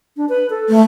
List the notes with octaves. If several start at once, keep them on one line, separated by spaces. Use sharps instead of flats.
D4
B4
A4
A3